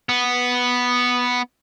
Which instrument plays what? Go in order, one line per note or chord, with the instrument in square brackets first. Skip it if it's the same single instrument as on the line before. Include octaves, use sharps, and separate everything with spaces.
[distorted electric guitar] B3